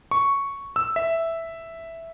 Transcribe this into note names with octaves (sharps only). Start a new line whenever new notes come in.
C#6
E6
E5